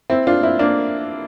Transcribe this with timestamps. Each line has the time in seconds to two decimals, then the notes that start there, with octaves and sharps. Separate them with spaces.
0.10 C4 E4
0.27 D4 F4
0.42 C4 E4
0.59 A#3 D4